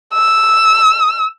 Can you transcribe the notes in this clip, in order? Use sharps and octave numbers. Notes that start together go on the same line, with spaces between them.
E6